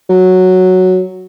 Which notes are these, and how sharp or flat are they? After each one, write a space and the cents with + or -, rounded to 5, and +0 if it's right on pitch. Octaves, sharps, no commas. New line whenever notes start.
F#3 +0